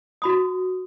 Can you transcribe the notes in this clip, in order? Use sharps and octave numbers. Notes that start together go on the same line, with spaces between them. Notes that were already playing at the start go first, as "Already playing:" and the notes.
F#4 B5 D#6